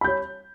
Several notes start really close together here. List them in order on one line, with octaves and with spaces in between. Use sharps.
B5 G6 C#5